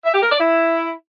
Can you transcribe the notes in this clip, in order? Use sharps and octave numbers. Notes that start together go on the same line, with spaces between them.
E5
G4
A#4
D5
E4